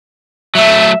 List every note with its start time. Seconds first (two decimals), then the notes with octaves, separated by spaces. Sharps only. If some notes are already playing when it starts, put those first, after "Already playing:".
0.55 F#3 A3 E5